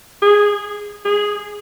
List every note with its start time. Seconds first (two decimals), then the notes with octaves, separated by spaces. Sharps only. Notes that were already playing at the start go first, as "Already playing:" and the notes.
0.22 G#4
1.05 G#4